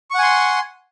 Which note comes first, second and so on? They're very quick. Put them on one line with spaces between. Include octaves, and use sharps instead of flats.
C#6 F#5 G#5 C6